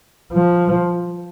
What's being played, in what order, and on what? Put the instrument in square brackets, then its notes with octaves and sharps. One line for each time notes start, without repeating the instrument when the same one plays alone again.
[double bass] F3